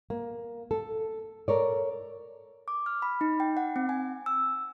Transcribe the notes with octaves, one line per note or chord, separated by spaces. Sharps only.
A#3
A4
A4 A#4 C#5 D5
D6
F6
B5
D#4
G5
F#5
C4
G#5
E6